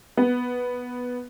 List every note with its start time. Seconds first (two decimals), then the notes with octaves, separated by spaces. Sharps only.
0.17 B3